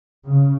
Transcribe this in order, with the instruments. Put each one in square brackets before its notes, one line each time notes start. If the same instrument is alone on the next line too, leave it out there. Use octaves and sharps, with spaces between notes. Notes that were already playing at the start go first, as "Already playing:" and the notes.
[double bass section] C#3